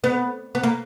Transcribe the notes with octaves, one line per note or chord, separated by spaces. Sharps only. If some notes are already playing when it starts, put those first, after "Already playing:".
B3
B3
A#3